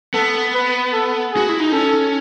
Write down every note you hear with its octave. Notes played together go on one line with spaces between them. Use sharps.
B3 A4
B4
A4
F#4 G#4
E4
D#4
C#4 A4